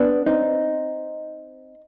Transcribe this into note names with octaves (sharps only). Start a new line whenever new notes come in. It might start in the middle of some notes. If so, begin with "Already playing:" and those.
Already playing: B3 D4
C4 D#4